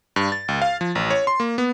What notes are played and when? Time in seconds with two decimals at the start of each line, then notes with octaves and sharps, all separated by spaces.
0.16 G2
0.32 A6
0.48 C#2
0.62 F5
0.81 F3
0.95 A1
1.10 C#5
1.27 C6
1.40 A#3
1.58 B3